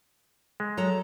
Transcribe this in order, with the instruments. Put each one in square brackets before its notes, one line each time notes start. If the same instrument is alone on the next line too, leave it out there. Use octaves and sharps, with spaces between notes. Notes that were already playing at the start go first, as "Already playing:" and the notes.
[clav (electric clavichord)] G#3
[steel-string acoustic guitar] F#3 A4 A#5